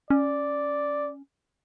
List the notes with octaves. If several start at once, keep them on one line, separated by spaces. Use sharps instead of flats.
C#4 D5